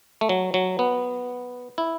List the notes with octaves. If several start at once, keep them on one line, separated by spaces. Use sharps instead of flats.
A3
F#3
F#3
B3
E4